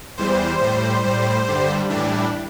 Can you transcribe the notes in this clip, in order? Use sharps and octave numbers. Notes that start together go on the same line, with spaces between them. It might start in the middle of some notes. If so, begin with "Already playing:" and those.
E2 E3 G3 C5
A2 G3
A2 G3
G2 D3 G3
A2 E3 G3 D4